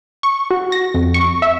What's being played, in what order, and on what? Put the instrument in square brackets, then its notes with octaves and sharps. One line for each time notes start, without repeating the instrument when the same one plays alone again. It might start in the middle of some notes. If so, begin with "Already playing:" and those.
[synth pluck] C#6
F#4
A#6
F2
C#6
E5